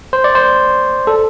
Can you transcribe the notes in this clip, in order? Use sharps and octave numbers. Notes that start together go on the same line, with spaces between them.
C5
D5
C5
A4